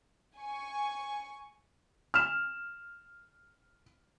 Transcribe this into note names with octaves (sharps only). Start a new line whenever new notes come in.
G#5 C#6
F6 E7